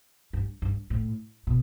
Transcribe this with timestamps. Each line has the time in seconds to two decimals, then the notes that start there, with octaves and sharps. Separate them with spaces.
0.33 G2
0.62 G2
0.90 A2
1.47 B2